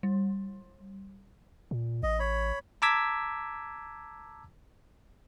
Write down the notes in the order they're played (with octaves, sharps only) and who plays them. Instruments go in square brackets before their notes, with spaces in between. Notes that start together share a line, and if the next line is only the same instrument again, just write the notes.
[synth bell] G3
[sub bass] A#2
[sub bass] A1 [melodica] D#5
[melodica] C#5 B5
[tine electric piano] A5 A#5 D6 E6 G#6 B6